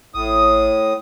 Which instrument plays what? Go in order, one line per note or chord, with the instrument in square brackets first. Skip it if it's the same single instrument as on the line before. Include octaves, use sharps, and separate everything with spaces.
[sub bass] A1 [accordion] A2 D#6